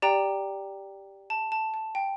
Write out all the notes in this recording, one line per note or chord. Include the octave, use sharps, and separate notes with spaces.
G4 D5 G5 A#5
A5
A5
A5
G5